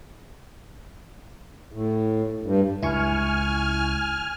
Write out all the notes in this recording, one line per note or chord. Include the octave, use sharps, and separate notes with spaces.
A2
G2
C#2 E4 G#5 C#6 F6